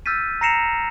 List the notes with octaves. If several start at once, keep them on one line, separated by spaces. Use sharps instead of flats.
E6 F6 G6 A6 B6 D#7
A#5 A#6 C7 C#7 E7 F7